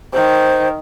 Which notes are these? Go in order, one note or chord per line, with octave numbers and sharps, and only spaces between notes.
D#3 C5